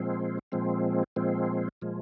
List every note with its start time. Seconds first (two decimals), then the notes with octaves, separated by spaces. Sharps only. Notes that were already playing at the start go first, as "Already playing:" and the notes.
Already playing: A#2 F3 G#3 C4
0.52 A#2 F3 G#3 C4
1.16 A#2 F3 G#3 C4
1.82 A#2 F3 G#3